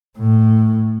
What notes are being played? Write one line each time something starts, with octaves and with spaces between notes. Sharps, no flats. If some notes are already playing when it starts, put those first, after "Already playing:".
A2